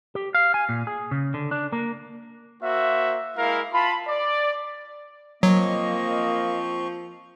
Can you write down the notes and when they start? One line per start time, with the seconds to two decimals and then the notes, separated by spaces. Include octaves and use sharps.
0.15 G4
0.34 F5
0.54 G#5
0.69 A#2
0.87 G#4
1.11 C#3
1.34 D3
1.51 D4
1.72 A#3
2.63 A#3 F#4 C5 E5
3.37 G#3 A#3 E4 A#4 F5
3.74 F4 A5 B5
4.08 D5
5.43 F3 F#3 A#3 C4 D#5 C#6